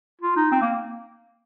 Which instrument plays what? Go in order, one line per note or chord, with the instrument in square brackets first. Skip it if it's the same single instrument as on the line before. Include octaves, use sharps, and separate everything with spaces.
[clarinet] F4
D#4
C4
A#3